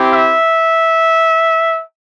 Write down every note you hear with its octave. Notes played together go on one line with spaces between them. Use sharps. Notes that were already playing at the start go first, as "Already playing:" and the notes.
Already playing: C4 E4 G4
E5